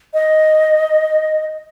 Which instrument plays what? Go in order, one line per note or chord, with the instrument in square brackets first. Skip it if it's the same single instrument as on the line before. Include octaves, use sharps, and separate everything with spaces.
[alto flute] D#5